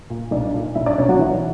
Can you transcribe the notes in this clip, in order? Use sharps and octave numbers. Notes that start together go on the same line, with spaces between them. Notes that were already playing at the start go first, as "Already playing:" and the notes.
A#2
B1 D4 D5
A#2
B1 E4 E5
D4 D5
B2 C#4 C#5
F#3 F#4
B1 E3 E4